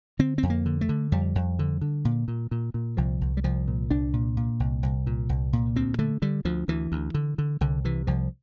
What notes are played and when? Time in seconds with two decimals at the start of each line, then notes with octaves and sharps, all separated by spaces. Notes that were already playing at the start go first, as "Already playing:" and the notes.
0.19 D3 C4
0.38 F2 C4
0.50 A#3
0.66 D3
0.81 A3
0.89 D3
1.12 F2 G3
1.35 F2
1.59 D3
1.81 D3
2.05 A#2
2.28 A#2
2.51 A#2
2.74 A#2
2.97 C2 F3
3.21 C2
3.37 G3
3.44 C2 F3
3.68 A#2
3.91 C2 D4
4.13 A#2
4.37 A#2
4.60 C2
4.83 C2
5.07 A#2
5.29 C2
5.53 A#2
5.76 D2 C4
5.99 D3 A3
6.22 D3 G3
6.45 D2 F3
6.68 D2 E3
6.92 D2
7.14 D3
7.38 D3
7.61 C2 D3
7.85 C3 E3
8.07 C2 F3